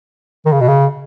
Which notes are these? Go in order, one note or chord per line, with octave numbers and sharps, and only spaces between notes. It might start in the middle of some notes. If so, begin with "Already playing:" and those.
D#3
C#3
B2
C#3